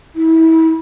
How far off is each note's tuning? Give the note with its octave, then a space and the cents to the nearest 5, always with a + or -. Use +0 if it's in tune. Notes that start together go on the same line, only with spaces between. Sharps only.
E4 -30